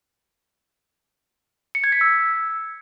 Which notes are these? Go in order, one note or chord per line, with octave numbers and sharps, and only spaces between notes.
C#7
G#6
B6
E6